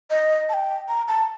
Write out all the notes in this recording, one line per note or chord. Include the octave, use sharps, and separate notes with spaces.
D#5
A5
G5
A#5
A5